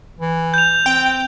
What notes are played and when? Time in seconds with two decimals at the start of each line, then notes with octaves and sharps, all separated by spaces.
0.20 E3
0.54 G6 F7
0.86 C4 G5